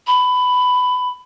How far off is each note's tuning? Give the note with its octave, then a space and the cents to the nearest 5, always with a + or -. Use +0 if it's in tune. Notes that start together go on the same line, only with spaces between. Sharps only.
B5 +15